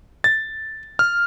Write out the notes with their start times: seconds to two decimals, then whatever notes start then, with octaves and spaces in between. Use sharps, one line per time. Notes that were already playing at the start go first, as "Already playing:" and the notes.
0.24 A6
0.99 F6